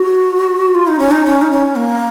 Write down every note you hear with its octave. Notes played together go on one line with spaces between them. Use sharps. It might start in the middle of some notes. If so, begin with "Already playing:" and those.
Already playing: F#4
F4
D#4
C#4
D#4
C#4
D#4
C#4
A#3